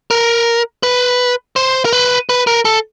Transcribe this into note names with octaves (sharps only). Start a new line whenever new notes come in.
A#4
B4
C5
A#4
B4
B4
A#4
A4